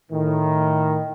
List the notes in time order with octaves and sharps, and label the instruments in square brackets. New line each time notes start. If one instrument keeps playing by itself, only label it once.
[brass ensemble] A2 D#3